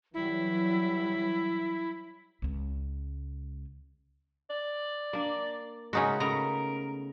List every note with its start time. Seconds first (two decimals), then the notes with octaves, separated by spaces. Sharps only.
0.14 E3 F#3 G3 E4
2.42 C#2 C#4
4.50 D5
5.13 A#3 D4
5.93 C#3 G#3 C#4 D#4 F#4
6.20 C#3 A3 B3 A#4 A#5